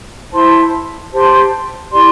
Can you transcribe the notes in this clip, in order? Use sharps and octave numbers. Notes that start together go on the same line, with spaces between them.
E4 C5 A5 C6
G4 C5 A5 C6
E4 G4 D5 C6